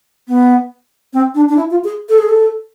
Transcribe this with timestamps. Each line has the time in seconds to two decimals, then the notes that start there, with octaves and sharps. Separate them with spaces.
0.28 B3
1.13 C4
1.34 D4
1.49 D4
1.56 E4
1.70 F4
1.84 G#4
2.09 A4
2.18 G#4
2.29 A4